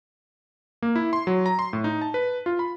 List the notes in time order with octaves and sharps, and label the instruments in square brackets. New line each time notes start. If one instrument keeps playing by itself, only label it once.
[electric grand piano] A#3
E4
C6
F#3
A#5
C6
A2
D#4
A5
B4
F4
B5